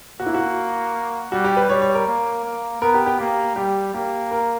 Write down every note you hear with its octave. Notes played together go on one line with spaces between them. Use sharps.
A#3 F#4
E4
F#4
G3 F#4
G4
B4
G3 C#5
C#5
A#4
A#3
A#3
B3 A#4
G4
G4
A#3 G4
G3 G4
A#3 G4
A#4